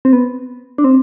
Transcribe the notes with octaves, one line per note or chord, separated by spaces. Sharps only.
C4
B3
D4
C4